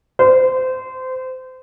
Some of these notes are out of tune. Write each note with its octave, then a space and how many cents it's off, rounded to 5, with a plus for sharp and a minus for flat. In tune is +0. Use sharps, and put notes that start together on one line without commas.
C5 -25